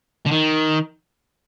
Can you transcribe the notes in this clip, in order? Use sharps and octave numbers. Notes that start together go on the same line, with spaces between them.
D3
D#3